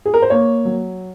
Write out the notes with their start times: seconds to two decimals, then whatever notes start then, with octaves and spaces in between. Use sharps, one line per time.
0.06 G#4
0.14 A#4
0.22 C5
0.30 A#3 C#5
0.65 F#3